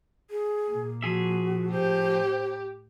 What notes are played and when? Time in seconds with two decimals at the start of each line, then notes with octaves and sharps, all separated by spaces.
0.30 G#4
0.70 A#2 A#3
1.02 F3 F#4 G#4 E5
1.71 A2 G4 C5